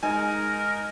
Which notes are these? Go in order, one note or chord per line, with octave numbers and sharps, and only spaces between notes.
G#3 D#4 A#4 G#5